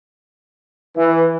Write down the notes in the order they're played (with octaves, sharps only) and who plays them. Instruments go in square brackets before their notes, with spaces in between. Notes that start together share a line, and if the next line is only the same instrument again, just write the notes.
[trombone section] E3